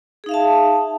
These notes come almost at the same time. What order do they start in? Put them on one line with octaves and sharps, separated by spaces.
G#4 D#4 F5 E5 A5